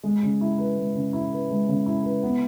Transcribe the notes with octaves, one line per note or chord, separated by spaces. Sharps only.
G#3
C#3
E4
B4
G#3
C#3
E4
B4
G#3
C#3
E4
B4
B3